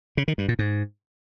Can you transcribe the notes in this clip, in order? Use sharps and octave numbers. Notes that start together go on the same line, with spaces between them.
C#3
D#3
G2
A#2
G#2